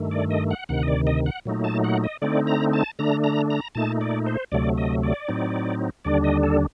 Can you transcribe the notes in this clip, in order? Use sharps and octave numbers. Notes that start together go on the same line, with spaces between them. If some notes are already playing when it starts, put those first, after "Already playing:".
Already playing: G2 D#3 A3
D5
D#5
F#5
D2 C3 D#3 F#5
D#5
D5
D#5
F#5
A#2 F#3 A3 D#4
A5
F#5
D#5
D3 A3 C4 D#4 D5
A#5
A5
D3 A3 D4 A#5
A#5
A#5
A#2 A3 D#4 A5
D5
C5
D2 C3 F#3 A3 D5
D#5
D5
A2 F#3 C4 D#4
D#2 D3 G3 D4 D5
D#5
A4